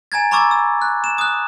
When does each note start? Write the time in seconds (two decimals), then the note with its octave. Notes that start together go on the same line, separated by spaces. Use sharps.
0.12 G#5 A#5 G#6 A6
0.31 A#5 B5 C#6 D6 E6 A6
0.51 E6
0.82 F#6
1.04 E7
1.18 D#6 F#6